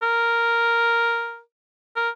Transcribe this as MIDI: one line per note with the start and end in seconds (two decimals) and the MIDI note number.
0.03 1.40 70
1.96 2.10 70